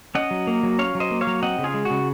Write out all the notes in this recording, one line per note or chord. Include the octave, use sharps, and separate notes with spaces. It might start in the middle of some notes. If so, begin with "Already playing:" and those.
C#4 D#5 F#5
F#3
A#3
F#3
C#4 C#5 F5
F#3
C5 D#5
A#3
C#5 F5
F#3
C4 D#5 F#5
C#3
F4 G#4
G#3
F#4
C#3